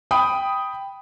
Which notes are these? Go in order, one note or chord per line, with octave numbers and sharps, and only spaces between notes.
G5 B5 D#6